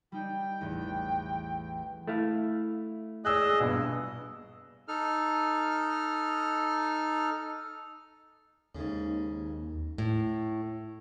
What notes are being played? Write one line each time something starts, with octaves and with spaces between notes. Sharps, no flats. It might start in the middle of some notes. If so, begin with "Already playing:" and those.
G3 D#4 G5
A1 E2
A3 E4 F5
G#4 D5 D#5 E6 F#6
A#1 G2 B2
D#4 A4 F6
D#2 G#2 C#3
A2